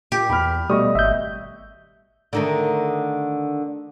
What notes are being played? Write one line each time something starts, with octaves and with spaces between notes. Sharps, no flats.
A#2 G4
E2 B5 F6
B2 G3 A3 D#5 C#6 D#6
G#1 E5 G6
D3 D#3 A3